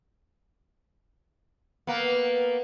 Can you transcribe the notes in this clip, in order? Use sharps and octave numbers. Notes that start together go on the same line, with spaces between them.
A#3 B3